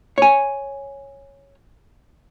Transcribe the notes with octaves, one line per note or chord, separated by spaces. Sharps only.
C#5 G#5